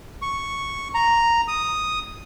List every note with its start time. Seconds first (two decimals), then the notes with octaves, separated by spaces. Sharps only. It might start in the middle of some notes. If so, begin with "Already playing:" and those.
0.22 C#6
0.95 A#5
1.48 D#6